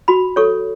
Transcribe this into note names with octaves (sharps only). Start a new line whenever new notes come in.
F#4 B5
A4 C#5 C#6